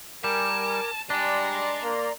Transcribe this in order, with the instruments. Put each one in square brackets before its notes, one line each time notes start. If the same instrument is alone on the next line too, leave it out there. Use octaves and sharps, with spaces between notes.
[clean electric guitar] G3 [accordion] A#4 G#5 D6 [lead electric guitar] A5
[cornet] G3 [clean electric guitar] D4 [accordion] D5 A#5 C6 [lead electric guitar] D#5 G#5
[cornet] A#3